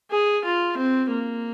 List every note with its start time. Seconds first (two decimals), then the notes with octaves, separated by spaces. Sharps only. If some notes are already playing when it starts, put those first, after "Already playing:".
0.11 G#4
0.44 F4
0.77 C4
1.10 A#3